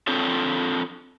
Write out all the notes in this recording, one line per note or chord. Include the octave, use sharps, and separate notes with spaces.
C4 D4 F4 A4 C#5